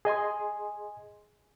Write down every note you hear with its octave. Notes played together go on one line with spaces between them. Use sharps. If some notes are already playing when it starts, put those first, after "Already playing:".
G#4 D#5 G#5 C6